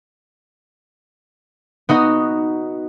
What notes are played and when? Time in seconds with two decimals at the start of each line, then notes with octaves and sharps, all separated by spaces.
1.89 B3 D#4 F#4 D#5